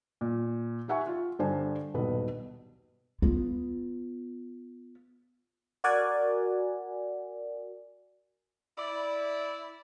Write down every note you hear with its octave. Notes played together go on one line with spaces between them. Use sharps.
A#2
D#4 G4 E5 F#5 G#5 C#6
F4
G2 D3 D4 C5 D5 G#5
D#1 B1 G2 B2 B4
B3 F4
F#4 A#4 D5 F#5 G#5
E4 D5